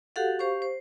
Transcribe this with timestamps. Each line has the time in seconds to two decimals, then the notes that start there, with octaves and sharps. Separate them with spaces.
0.16 F#4 G4 A4 F5 F#5
0.39 G4 C5 F5 C#6
0.62 C5